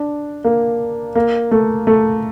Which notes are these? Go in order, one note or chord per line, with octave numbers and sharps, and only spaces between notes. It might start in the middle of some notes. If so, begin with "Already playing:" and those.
Already playing: D4
A#3
A#3
A3
A3